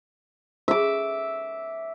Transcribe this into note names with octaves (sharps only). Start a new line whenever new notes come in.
E5 D6